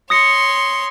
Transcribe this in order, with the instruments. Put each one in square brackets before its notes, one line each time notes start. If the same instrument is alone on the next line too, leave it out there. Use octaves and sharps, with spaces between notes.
[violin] C#5 C6 [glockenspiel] D#6 A#6 C#7